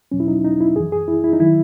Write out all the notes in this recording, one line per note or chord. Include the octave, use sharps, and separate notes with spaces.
E2 B2 F#3 C#4
E4
D#4
D#4
E4
F#2 E3 G#4
G#4
E4
E4
D#4
D#3 F#3 E4